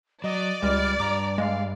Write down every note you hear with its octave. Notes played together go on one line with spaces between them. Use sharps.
F#3 D5 D#5
C#2 G3 G#3 F6
G2 A#5 D6
G#3 F5